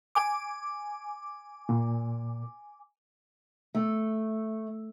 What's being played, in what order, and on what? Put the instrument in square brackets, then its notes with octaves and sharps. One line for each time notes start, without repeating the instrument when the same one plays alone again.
[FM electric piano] G#5 D6
[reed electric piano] A#2
[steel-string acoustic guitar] A3